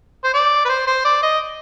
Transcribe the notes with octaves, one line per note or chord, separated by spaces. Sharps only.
C5
D5
B4
C5
C5
D5
D#5